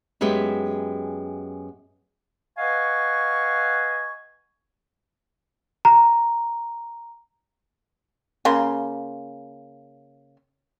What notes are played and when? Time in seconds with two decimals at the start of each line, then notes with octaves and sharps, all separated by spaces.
0.21 F#2 G#3 B3 G4 E5
2.58 B4 D#5 F5 F#5 G#5 C#6
5.85 A#5
8.45 C#3 A#3 C6